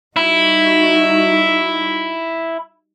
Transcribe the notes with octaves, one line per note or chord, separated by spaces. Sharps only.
G3 D#4 E4 F#4